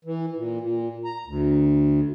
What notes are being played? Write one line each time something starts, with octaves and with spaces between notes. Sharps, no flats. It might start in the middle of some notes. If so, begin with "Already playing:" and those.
E3
A#2
A#2
A#5
D2